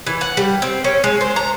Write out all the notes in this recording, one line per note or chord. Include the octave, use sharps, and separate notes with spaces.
E3
F#5
G3
C4
C#4
G#3
C5
A#5